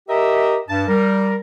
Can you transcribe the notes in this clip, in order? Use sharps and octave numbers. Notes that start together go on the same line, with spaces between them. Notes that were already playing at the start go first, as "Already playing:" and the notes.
G4 A#4 D#5 E5
G2 A5
G3 A#4